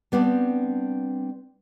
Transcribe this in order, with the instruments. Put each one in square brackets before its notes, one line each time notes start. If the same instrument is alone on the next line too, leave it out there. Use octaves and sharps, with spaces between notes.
[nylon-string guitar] G3 B3 C4 D4